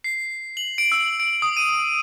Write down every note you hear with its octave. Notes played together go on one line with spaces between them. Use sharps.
C7
F#7
D7
E6
D7
D#6
D#7